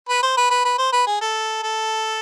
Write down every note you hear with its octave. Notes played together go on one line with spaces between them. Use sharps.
B4
C5
B4
B4
B4
C5
B4
G#4
A4
A4